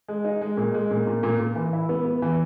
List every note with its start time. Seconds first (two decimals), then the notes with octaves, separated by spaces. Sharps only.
0.08 G#3
0.25 D#4
0.41 G#3
0.57 A#2
0.74 G#3
0.91 A#2
1.07 A#2
1.23 A#2
1.40 A#2
1.56 E3
1.73 E4
1.89 B3
2.05 B3
2.22 E3